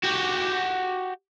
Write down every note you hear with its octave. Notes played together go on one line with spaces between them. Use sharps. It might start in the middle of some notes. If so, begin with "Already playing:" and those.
F#4 G4